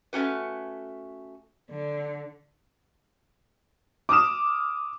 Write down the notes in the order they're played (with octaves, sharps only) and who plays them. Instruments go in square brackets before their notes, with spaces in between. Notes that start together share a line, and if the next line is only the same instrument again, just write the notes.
[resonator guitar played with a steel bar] A3 C#4 F#4 B4
[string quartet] D3
[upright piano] D6 D#6 F6 E7